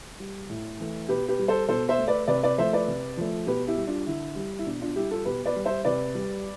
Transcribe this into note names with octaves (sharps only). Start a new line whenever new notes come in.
G3
A2
E3 A3
B2 G4 B4
G4 B4
G3
A4 C5
B2 A4 C5
C5 E5
A3
B4 D5
C3 B4 D5
B4 D5
F3 A3 C5 E5
B4 D5
C3
F3 A3
B2 G4 B4
E4 G4
G3
D4 F4
D3 E4
G3
E4
B2 D4
D4 F4
G3 E4 G4
F4 A4
B2 G4 B4
B4 D5
G3
C5 E5
C3 B4 D5
G3